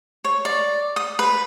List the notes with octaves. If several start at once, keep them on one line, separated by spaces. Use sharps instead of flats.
C#5
D5
D#6
B4